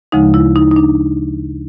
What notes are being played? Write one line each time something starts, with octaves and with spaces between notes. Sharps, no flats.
D2 C#3 F3 G#3 D#4
E4
D#4
D#4
D4